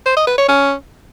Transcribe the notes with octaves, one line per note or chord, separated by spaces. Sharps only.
C5
D#5
B4
C#5
C#4